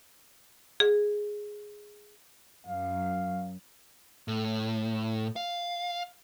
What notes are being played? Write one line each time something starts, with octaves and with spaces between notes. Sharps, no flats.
G#4
F#2 F5
A2
F5